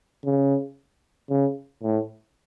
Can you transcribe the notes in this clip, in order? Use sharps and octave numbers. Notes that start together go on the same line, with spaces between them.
C#3
C#3
A2